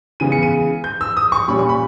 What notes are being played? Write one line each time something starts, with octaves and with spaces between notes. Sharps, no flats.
C#3 E3 G#3 B3 D#7
C#7
D#7
G6
E6
D#6
C#6
A#2 G3 C#4 B5
C#6
B5